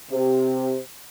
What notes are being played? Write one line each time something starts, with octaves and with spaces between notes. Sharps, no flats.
C3